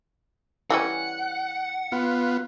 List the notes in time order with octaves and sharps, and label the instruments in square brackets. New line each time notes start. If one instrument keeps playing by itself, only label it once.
[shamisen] E3 G3 C#4 [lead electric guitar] F#5
[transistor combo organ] B3 F4